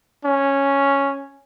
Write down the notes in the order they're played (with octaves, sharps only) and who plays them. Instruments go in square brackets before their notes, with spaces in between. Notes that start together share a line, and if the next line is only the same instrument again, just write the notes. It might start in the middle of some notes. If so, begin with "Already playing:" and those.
[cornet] C#4